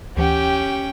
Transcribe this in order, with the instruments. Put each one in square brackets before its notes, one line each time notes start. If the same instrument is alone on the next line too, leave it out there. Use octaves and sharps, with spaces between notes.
[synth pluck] D2 E3 F#5 [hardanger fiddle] C#4 G5 [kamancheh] G4